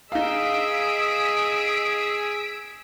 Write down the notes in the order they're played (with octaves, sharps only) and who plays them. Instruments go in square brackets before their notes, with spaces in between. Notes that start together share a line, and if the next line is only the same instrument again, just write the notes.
[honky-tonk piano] D#4 F5 [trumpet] G#4 [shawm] D#5 [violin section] E6 B6 D7